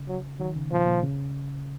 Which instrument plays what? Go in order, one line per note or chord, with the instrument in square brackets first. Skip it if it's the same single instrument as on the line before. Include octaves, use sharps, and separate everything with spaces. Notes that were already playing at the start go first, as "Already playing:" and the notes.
Already playing: [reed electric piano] C#3
[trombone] F#3
[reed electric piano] D#3 [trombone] F#3
[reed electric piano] C#3
[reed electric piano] A#2 [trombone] F3
[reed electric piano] A#2
C#3